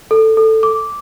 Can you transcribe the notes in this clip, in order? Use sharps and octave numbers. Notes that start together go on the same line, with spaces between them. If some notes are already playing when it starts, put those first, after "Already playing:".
A4
A4
D6